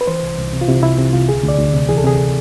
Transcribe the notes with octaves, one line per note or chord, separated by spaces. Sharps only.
B4
E3 C5
C2
C2
C3
F4
C3 E4
C2 E4
C3
C2 F4
D2 G#4
D2
D5
D2
C3
E3 G#4
A4
C3 G#4